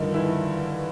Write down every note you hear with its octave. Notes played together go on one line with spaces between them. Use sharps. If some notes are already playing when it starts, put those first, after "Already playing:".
Already playing: G2 D3 D#3 F3 D#4
E3 E4